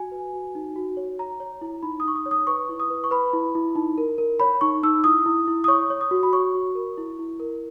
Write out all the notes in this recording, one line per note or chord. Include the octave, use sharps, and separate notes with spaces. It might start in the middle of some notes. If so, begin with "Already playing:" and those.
Already playing: F#4 G#5
B4
F#4
D#4
F#4
C#5
C#5 A#5
C#5
E4
D#4 B5
D#6
D#4 C#6
D#6
C#5
D#6
B4 C#6
E4
D#6
B4
C#6
B4 B5
E4
E4
D#4
A#4
A#4
C#5 B5
D#4 C#6
D#4 E6
E4 D#6
E4
E4
D#6
C#5 C#6
C#5
D#6
F#4
B5
C#5 C#6
F#4
A#4
E4
E4
A#4